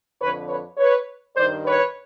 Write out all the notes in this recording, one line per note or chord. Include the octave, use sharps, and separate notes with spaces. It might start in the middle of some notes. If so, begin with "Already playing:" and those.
F2 D3 B4 C#5
B4 C#5
B4 C#5
G2 D#3 C5 D5
B4 C#5